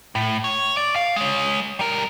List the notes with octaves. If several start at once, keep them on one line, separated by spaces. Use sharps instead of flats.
A2
C#5
D5
F5
G#3 C#5
G3 A#4